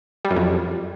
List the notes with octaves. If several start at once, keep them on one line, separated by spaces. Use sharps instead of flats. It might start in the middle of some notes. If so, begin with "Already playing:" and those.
G3
F#2
F2